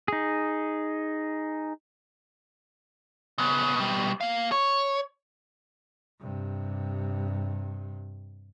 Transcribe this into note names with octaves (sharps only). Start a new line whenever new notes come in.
D#4 G#4
C#3 B3
B2 G3
A#3 F5
C#5
G2 C3